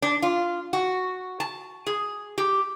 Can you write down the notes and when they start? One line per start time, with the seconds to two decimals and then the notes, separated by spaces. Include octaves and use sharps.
0.02 D4
0.22 F4
0.73 F#4
1.40 A5
1.86 G#4
2.38 G4